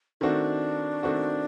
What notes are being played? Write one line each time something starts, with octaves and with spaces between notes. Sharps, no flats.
D#3 A3 C4 D4 F#4
D#3 A3 C4 F#4